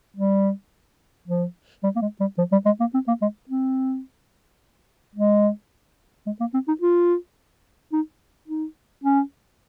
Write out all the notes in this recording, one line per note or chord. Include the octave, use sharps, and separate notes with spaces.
G3
F3
G3
A#3
G#3
G3
F3
G3
G#3
A#3
C4
A#3
G#3
C4
G#3
G#3
A#3
C4
D#4
F4
D#4
D#4
C#4